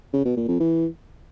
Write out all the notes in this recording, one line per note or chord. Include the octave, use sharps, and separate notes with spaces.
C#3
B2
A#2
F2
E3